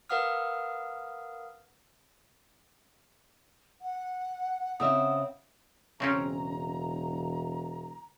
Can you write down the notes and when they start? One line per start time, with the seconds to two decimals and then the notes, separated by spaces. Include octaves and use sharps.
0.10 A#4 B4 F5 F#5 D#6 F6
3.81 F#5
4.80 C#3 C4 E5 D#6
6.00 E1 C#3 C4 C#4 A#5